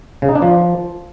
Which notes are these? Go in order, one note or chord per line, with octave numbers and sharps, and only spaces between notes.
C#3
D#4
D4
F3